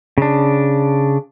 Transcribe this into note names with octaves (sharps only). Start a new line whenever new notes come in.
C#3 D4